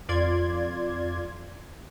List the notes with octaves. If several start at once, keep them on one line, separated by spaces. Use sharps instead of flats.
F2 F4 D5 C6 G#6